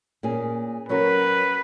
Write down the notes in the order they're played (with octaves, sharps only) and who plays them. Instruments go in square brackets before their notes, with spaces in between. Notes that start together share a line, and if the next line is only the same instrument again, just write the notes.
[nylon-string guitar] A#2 A#3 C#4 G#4
[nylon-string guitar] F#3 C#4 F#4 A#4 [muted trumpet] B4